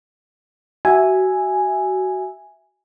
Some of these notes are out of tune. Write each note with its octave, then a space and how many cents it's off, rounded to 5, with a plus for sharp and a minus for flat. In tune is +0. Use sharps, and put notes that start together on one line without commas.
F#4 +25 E5 +0 G#5 +0